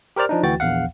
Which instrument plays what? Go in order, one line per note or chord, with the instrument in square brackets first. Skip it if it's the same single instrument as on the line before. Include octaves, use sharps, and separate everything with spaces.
[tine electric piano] G4 A#4 C5 D5 F6
F3 D4 D#4
D2 E3 F#4 G5 A6
A#1 E2 F5 F#5